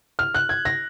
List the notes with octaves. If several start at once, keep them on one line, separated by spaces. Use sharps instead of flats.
F6
F#6
G#6
A#6